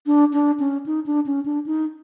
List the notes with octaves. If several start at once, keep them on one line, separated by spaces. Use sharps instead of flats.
D4
D4
C#4
D#4
D4
C#4
D4
D#4